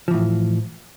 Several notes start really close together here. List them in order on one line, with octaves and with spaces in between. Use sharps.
F3 E3 A2